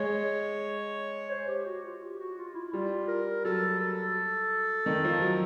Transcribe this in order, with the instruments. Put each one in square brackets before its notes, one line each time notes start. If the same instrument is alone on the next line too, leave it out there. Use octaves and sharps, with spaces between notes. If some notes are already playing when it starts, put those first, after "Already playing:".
Already playing: [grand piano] G#3 [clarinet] C#5
[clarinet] C5
G4
F#4
F4
G4
F#4
F4
E4
[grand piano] G3 [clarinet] F4
[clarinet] A#4
[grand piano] F#3 [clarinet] A4
[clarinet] A4
[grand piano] D#3
F3
F#3